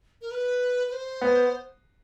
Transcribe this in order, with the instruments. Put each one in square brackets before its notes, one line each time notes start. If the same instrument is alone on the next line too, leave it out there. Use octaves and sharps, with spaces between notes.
[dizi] A#4
B4
B4
C5
[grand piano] B3